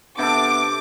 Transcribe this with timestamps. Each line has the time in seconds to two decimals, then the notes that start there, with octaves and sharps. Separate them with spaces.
0.19 C3 B3 D4 A4 D6